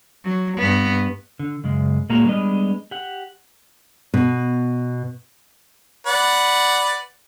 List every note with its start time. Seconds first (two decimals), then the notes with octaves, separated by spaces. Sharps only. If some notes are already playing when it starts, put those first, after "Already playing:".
0.24 F#3
0.57 G2 B3
1.39 D3
1.64 F#2 C#3 G#3
2.10 A#2 G#3 A#3 F#4 A#5
2.26 G3 G#3 B3 D4 D#5
2.91 G4 F#5
4.14 B2
6.06 B4 D5 F#5